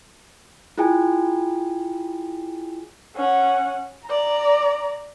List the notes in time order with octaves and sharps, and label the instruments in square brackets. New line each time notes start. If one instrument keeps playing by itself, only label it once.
[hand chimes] E4 F4 G#4 G5 G#5
[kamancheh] C#4 F#5
D5 A#5